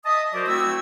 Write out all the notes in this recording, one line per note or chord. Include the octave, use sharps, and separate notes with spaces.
D#5 E5 A5 D#6
F#3 F#4 A#4 C5 D5 D6
A3 C4 E4 F#4 E6